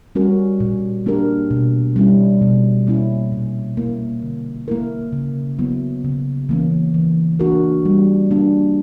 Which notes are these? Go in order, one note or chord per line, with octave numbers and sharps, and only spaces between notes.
G3 C#4 F#4 A#4
A#2
A#3 D4 G4 A#4
B2
G3 C#4 E4
B2
A#3 C#4 E4
A#2
A#3 E4
D3
A#3 E4 A#4
C#3
F#3 B3 E4
C#3
E3 A#3 C#4
E3
A#3 D4 F#4 A#4
G3
A#3 D4